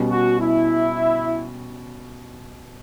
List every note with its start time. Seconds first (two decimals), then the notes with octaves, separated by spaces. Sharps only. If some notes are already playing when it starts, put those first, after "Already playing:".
Already playing: B2 G3 C#4
0.11 F#4
0.40 E4